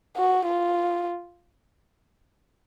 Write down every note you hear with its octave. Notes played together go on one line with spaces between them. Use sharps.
F#4
F4